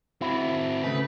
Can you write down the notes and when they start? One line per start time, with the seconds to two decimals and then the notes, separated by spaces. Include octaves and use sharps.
0.21 C4 E4 F#4
0.84 C#3 A3 B4